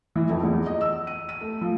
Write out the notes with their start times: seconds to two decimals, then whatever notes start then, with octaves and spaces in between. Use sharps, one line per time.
0.16 E3
0.29 F2
0.43 E2
0.66 D#5
0.81 E6
1.07 D#7
1.29 D#7
1.41 A3
1.61 F3